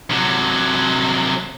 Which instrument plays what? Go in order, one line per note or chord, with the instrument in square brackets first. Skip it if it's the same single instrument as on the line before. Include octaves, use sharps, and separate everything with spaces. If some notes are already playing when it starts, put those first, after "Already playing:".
[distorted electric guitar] C3 F#3